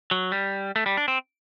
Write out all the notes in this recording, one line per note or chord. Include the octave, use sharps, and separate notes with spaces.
F#3
G3
A3
G3
D4
C4